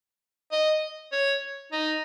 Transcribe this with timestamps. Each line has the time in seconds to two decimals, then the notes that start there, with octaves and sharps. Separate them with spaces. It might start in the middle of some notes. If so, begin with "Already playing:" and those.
0.52 D#5
1.12 C#5
1.72 D#4